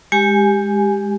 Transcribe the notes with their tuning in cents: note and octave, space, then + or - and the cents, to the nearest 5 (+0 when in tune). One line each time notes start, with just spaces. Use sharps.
G#3 -15 G4 +5 G#5 +5